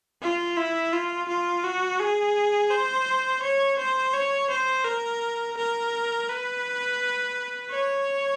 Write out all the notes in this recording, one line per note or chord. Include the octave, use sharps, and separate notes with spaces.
F4
E4
F4
F4
F#4
G#4
C5
C#5
C5
C#5
C5
A#4
A#4
B4
C#5